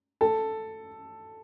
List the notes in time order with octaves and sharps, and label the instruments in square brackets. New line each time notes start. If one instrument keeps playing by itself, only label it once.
[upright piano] A4